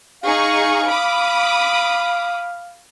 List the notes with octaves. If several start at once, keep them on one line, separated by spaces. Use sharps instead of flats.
D#4 G#4 F5 C#6
B5 D6 D#6